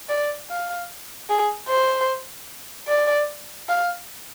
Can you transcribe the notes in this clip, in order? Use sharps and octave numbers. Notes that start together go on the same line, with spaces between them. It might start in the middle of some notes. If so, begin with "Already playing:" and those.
D5
F5
G#4
C5
D5
F5